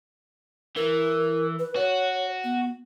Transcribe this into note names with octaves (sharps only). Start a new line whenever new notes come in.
E3 A#4
B4
F#4 C#5
B3